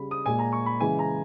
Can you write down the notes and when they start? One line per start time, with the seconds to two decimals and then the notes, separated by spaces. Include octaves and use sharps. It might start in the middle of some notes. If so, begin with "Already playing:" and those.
Already playing: C#3 G3 B5
0.11 D#6
0.26 A#2 G#3 G#5
0.39 A#5
0.52 C#6
0.66 B5
0.80 C#3 E3 G#3 G#5
0.99 A#5